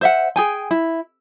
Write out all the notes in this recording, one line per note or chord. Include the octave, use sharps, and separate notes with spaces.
C5 E5 F#5
G#4 G5 G#5
E4